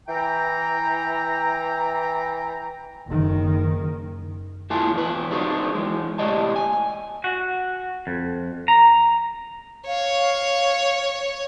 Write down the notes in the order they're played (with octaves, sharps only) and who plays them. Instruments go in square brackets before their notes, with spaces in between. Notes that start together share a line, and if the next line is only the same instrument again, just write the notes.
[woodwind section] E3 G5 A#5
[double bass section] F#1 D#3
[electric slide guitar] A3 E4 F4 G#5 A5
E2 B2 B4
D4 D#4 F#4 G#4 C5
E3 G#3
A2 C3 G4 D5 D#5 A5
G#5
[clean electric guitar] F#4
F2
A#5
[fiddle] C#5 [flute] F5